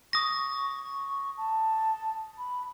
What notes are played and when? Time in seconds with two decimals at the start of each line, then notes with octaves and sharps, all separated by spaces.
0.13 C#6 D#6 A#6
1.37 A5
2.38 B5